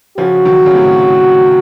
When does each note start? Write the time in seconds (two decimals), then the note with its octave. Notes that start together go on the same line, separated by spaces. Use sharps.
0.18 C#3 F3 F#4
0.45 D#3 F#3
0.66 C#3
0.74 A2 C3